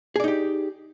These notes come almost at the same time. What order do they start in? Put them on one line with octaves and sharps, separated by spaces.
G#4 D5 D#4 G4